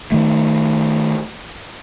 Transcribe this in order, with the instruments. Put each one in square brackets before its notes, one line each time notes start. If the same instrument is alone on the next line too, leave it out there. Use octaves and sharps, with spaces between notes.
[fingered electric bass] D#3 A3